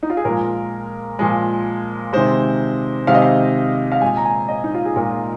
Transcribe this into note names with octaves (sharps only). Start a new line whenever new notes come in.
D#4
F4
G#4
A#2 F3 G#3 A#4
A#2 F3 G#3
C3 D#3 G#3 C5
C3 D#3 G#3 F5
D#5
F5
F5
A#2 G#3 G#5
A#5
G#5
D#5
D#4
F4
G#4
A#2 G#3 A#4